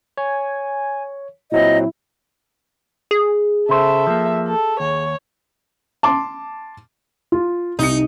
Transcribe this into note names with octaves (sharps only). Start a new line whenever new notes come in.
C#5 G#5
A#2 F#3 C4 E4 D#5
G#4
C#3 A4 C5 E5
F3 A#3
A4
D#2 C#5
A5 C6 D6
F4
C2 D#4 C#7